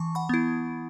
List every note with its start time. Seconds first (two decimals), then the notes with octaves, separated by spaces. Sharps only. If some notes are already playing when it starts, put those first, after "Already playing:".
Already playing: E3 A5 C#6
0.15 F#5 B5
0.29 B3 E4